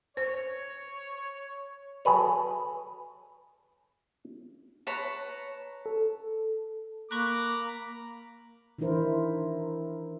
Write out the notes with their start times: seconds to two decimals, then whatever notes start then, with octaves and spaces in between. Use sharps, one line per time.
0.17 C5 C#5
2.05 F#3 G#4 A4 B4 C#5
4.87 B4 C#5 A5 A#5
5.86 A4
7.11 A#3 A#5 B5 C#6 D6 F#6
8.78 D#3 E3 D4 E4 A#4 C5